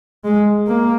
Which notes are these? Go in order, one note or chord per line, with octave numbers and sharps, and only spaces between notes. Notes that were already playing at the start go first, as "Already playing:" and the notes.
G#3
A#3